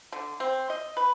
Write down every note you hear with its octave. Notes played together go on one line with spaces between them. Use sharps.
D3
C4
D#5
B4